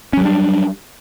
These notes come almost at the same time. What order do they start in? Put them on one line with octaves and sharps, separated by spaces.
C#4 F#3 G3 D4